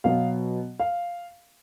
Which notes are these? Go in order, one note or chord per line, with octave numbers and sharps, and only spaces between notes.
B2 F#3 B3 F5
F5